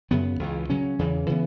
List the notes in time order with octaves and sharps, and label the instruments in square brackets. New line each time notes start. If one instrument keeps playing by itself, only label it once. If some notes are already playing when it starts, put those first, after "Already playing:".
[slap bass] F#2 C#3 F#3 B3
C#2 C#3 E3
C#3 F#3 C#4
E2 C#3 E3
C#3 E3 B3